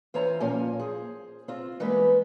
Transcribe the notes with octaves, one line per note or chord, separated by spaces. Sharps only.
E3 F4 C5 C#5 G#5 A#5
A#2 F3 A#3 C#4 G#5
G#4 C5
C4 F4
E3 G3 G#3 A#3 B3 B4